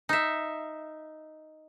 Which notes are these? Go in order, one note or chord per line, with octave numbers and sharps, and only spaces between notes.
D#4 E5